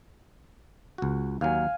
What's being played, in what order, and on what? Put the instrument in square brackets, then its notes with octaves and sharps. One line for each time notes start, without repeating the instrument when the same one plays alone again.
[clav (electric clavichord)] C#2 F#4
[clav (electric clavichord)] D#2 F#3 [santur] F5 G#5